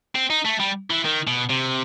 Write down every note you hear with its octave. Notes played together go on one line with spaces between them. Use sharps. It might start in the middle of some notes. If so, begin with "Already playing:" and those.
C4
D#4
A3
G3
E3
D#3
B2
C3